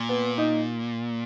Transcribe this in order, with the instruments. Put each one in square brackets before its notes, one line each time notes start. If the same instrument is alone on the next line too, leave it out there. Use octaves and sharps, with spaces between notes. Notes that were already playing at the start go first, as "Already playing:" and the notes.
Already playing: [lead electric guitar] A#2
[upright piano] B3
D#4